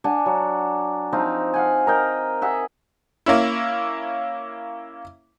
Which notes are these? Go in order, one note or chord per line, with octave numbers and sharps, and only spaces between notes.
D4 F#5 G#5
F#3
F3 C4 D#4 F4
F5 F#5 G#5
A#4 D#5 G5
G#4 D#5 E5 F#5
A#3 C#4 E4